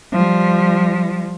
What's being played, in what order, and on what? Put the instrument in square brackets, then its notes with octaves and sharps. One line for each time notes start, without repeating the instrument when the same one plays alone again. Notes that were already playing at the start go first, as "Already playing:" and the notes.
[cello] F3 G3